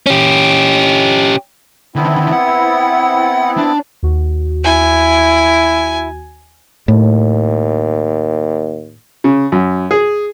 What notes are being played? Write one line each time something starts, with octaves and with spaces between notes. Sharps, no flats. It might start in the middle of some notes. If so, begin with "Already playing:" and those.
C#4 G4
D3 D#3 B3 C4 E4
F#5
D4
D#2 F#4
E4 G#5
D#2 A2
C#3
F#2
G#4